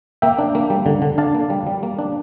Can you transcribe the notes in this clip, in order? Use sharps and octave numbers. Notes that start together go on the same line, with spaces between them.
A#3 E5 G5
D4
A#3
G3
D3
D3
D4 F5 A5
A#3
G3
G3
A#3
D4